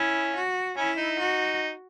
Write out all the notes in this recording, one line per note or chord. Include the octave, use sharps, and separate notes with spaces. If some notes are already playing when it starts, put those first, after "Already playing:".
Already playing: C#4 E4
F#4
C#4 E4
D#4
F#4